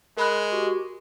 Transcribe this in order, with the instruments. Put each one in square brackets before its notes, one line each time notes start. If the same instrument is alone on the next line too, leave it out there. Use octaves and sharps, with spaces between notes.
[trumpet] G#3 [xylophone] A#4 B5 F#6
[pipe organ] F#4 G4